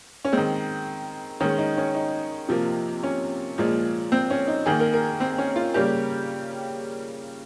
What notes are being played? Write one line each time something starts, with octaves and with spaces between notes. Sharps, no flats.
C#4
D#3 G#3 C4
D#3 G#3 C#4
D#4
C#4
D#4
C3 F3 A#3
C#4
A#2 F3 G#3
C4
C#4
D#4
D#3 A#3 G#4
A#4
A#4
C4
C#4
F4
C#3 G3 A#3 G4